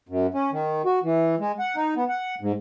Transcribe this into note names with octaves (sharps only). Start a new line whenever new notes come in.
F#2
C#4
D#3
F#4
E3
G#3
F#5
D#4
B3
F#5
G#2